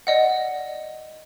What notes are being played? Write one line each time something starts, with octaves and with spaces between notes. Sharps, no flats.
D5 D#5 F#5